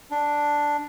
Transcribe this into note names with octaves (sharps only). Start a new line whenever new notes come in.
D4